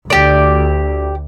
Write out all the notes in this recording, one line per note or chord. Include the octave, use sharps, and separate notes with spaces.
D2 G4 D5